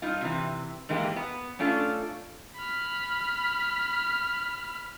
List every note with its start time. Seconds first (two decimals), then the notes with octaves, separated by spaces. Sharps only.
0.02 G2 D#4 F4
0.21 C3 E3
0.89 G#2 E3 G#3 A#3 G4
1.16 B3
1.59 A3 C#4 D4 F4 A4
2.56 B5 F6